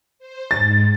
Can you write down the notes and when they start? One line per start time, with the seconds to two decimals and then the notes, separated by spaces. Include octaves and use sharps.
0.19 C5
0.51 G#2 A6